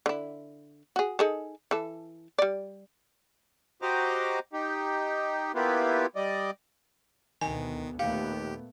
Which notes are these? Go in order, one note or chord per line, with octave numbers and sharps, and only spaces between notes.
D3 E4
F#4 G#4
D#4 G#4 A4
E3 A4
G3 D5
F#4 G4 C5 D#5 A#5 D6
D#4 G4
A#3 B3 E4 F4 G4 B4
G3 D5 D#5
D2 B2 D#3 B3 G#5
D#2 A#2 A3 B3 G4 F5